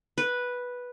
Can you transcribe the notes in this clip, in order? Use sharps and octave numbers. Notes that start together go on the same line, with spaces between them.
B4